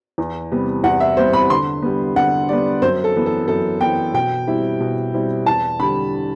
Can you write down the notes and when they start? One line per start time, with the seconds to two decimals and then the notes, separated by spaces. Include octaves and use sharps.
0.18 E2
0.51 C3 G3 B3
0.84 E2 F#5
1.00 E5
1.17 C3 G3 B3 C5
1.33 B5
1.49 D3 C6
1.82 G3 B3
2.16 D3 F#5
2.49 G3 B3 D5
2.82 F#2 C5
3.04 A4
3.15 E3 B3
3.26 A4
3.48 F#2 A4
3.81 E3 B3 G5
4.14 B2 G5
4.47 G3 C4 E4
4.80 B2
5.14 G3 C4 E4
5.46 E2 A5
5.80 D3 G3 B5